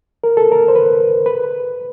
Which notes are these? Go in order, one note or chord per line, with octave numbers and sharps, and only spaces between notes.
A#4
A4
A#4
C5
B4
B4